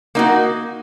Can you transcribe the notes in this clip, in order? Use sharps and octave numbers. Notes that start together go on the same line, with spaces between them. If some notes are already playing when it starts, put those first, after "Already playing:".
A#3 D#4 F#4